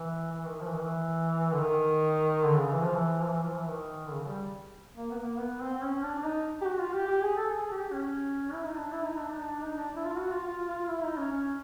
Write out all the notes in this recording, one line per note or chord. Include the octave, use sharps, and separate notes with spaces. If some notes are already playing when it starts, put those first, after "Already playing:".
Already playing: E3
E3
D#3
F3
E3
D#3
E3
D3
D#3
D3
C#3
E3
F3
E3
F3
E3
F3
E3
D#3
D3
C#3
G3
A#3
B3
A#3
B3
C4
C4
C#4
D4
D4
D#4
G4
F#4
F4
G4
G4
G#4
A4
G#4
G4
C#4
E4
D#4
D4
E4
D#4
D4
D#4
D4
D#4
D4
E4
F4
F#4
F4
F4
F4
E4
D#4
C#4
C#4